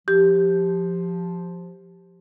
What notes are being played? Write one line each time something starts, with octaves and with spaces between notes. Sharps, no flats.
F3 G4